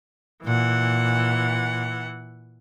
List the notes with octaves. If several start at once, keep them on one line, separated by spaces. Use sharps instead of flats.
A#2 E3 F#5